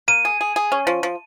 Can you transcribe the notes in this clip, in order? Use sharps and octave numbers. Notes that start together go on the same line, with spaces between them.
A#3 D#7
G#4
G#4
G#4
C#4
F3
F3